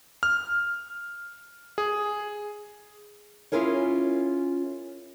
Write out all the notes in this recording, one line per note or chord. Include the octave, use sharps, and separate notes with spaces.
F6
G#4
C#4 E4 F4 G#4 A#4 C#5